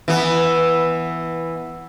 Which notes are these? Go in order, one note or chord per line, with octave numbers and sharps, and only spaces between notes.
E3 B3